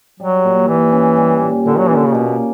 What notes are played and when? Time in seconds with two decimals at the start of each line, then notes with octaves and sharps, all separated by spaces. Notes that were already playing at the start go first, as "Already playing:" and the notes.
0.20 F#3 G3
0.44 A#2
0.68 A#2 E3
0.92 C#4
1.17 G3
1.41 A#2
1.66 A#2 D3
1.79 F#3
1.88 E3 C#4
1.97 D3
2.06 C#3
2.15 B2 A#3